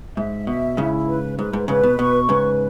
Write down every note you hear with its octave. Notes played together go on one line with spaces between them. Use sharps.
G#2 E5
B2 E5
G#2 C#3 E4
B4
G#2 B4
G#2
G#2 C#3 B4
B2
B2 C#6
G#2 C#3 B4